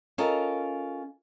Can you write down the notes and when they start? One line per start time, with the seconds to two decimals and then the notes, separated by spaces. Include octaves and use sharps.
0.18 C#4 F4 A4 A#4 D#5